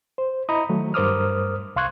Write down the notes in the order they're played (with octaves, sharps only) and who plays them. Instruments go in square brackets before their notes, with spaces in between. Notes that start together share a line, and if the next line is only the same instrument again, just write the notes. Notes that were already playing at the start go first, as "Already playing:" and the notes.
[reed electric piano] C5
E4 D#5 A#5 B5 D#6
D#3 F#3 A3
G2 A#4 C5 D6 D#6 F6
C2 F5 C6 C#6 F#6 G#6